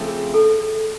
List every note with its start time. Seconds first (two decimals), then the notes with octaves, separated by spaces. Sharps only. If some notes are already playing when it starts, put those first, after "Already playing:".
Already playing: C#3 F3 A3 C4
0.08 G#4
0.34 A4